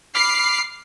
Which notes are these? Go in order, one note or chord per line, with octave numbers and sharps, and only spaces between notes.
B5 D6 F6 C7